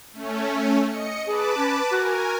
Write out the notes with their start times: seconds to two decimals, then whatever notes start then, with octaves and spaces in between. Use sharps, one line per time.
0.13 A3 C#4
0.86 D#5 C#7
1.26 G#4 B4 A5 D6
1.57 C#4
1.91 F#4 A#4 G#5